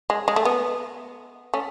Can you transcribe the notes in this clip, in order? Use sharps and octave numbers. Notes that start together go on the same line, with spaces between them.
G#3
G#3
A3
B3
A3 C#4